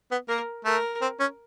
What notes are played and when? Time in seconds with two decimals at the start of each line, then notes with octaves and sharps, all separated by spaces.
0.11 B3
0.28 A#3 A#4
0.65 A3 A#4
1.01 C4
1.20 C#4